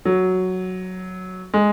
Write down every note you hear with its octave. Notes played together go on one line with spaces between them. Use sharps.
F#3
G#3